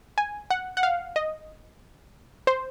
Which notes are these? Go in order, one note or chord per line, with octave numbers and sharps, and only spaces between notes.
G#5
F#5
F#5
F5
D#5
C5